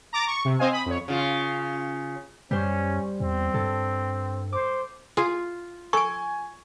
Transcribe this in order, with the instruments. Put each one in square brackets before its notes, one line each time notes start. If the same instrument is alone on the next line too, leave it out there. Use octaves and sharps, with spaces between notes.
[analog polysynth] A#5 D6 A6
C#6
C3
C4 C5 D#5 F5 G#5
B5 D#6
F2 C#5
[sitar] C#3 F4
[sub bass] F#2 [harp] G3 C5 [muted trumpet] C#4
[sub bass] E2 [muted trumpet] C4
[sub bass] G2 [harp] A4
[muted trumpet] C5 [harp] D6
[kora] F4 [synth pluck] G#4
[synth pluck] A4 D7 [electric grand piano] G#5 [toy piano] C#6